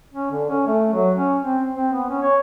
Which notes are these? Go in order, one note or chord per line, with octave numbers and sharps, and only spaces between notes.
C#4
D3
C#4
A3
F#3
C#4
C4
C4
B3
C#4
C#5